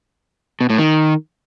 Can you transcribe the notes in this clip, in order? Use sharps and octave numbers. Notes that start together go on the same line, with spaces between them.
B2
A2
D#3